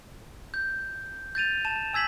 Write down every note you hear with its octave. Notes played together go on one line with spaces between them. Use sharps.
G6
G6 A6 D#7 F7
A5 E7
G#5 E6 G#6 B6 F#7